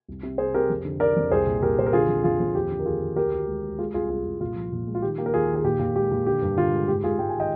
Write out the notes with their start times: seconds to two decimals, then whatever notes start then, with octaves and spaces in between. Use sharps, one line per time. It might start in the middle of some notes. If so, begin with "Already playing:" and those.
0.08 C2
0.23 C3
0.38 C3 G#4 C5
0.54 C3 G4 A#4
0.70 F2
0.85 D3
1.00 D3 A#4 D5
1.16 F2
1.31 C2 G#4 C5
1.47 A#2
1.62 A#2 G4 A#4
1.78 A#2 C5
1.86 A#4
1.93 D3 F4 G#4
2.09 F2
2.24 F2 F4 G#4
2.40 F2
2.55 D#2 G4
2.71 D3
2.80 A#4
2.86 D#2 F4 G#4
3.01 D#2
3.16 D2 G4 A#4
3.32 D2
3.48 G#3
3.63 G#3
3.79 G#3 F4 G#4
3.94 C2 F4 G#4
4.09 C2 F4 G#4
4.25 C2
4.41 A#2 F4
4.56 F3
4.72 A#2
4.87 G#3
4.95 F4
5.02 D#3 G4
5.18 A#3 G4
5.26 A#4
5.33 D#2 F4 G#4
5.49 D#3
5.55 G#4
5.64 A#2 G4
5.79 A#2
5.96 G#3 G4
6.11 A#2
6.26 D3 G4
6.42 G2
6.57 D3 F4
6.73 G#3
6.88 G#2 G4
7.04 G#2 F4 G#4
7.19 G#3 G5
7.29 G#5
7.35 D#3
7.40 D#5 G5